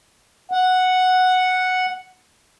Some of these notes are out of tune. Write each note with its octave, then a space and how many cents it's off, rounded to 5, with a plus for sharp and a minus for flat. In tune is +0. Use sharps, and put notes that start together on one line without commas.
F#5 -5